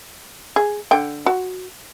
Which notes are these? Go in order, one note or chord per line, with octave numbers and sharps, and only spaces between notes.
G#4
D3 G5
F#4